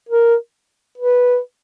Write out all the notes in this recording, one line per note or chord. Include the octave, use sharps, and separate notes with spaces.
A#4
B4